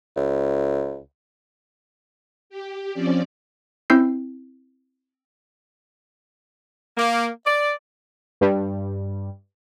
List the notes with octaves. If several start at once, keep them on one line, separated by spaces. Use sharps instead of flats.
C#2
G4
F3 C4 C#4 D5
C4 C#4 E4 E6 G6 C7
A#3
D5
G2 G3